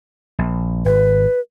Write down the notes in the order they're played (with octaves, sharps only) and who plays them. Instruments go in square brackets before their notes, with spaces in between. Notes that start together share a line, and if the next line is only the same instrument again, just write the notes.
[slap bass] A#1
[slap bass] G#1 [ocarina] B4